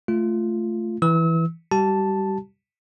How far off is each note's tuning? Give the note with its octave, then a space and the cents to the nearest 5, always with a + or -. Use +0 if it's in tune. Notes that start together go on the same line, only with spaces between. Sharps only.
A3 +0 F4 -10
E3 +0 E6 -40
G3 +5 G4 -40 A5 +0